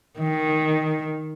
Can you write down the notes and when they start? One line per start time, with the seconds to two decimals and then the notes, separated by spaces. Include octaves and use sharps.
0.20 D#3